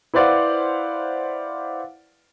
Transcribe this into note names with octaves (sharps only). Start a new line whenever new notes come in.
E4 B4 C5 D5 F5 F#5